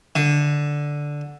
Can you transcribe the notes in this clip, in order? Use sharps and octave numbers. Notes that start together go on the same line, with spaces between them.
D3